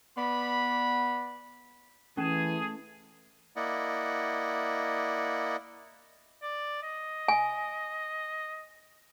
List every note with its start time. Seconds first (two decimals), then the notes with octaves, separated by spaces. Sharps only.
0.17 B3 D5 B5
2.17 E3 A3 C#4 G#4 G#5 A5
3.56 A#3 E4 D5 D#5 F#5
6.43 D5
6.83 D#5
7.28 G#5